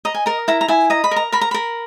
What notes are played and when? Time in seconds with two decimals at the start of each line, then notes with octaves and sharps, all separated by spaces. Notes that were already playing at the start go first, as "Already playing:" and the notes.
0.05 D#5 A#5
0.14 G#5
0.26 A#4 A#5
0.48 E4 A#5
0.61 A#5
0.68 E4 G#5
0.90 D#5 A#5
1.04 B5
1.11 A#4
1.16 A#5
1.32 A#4 B5
1.41 A#5
1.51 A#4 B5